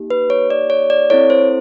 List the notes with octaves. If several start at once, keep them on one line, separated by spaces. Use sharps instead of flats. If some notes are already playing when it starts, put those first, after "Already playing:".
Already playing: A#3 D#4 G4
B4
C#5
D5
C#5
D5
C4 E4 A4 C#5
C5